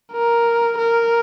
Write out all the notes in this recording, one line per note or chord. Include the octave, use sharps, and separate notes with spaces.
A#4
A#4